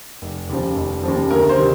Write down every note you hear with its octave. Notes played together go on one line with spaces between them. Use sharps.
F1
D#2 C#3 F3
F1
D#2 C#3 F3
D2 A#4
C5
C3 D#3 G3